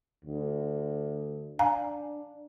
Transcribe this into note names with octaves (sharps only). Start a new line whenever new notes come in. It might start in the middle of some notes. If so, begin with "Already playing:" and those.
D2
D4 F5 G#5 A#5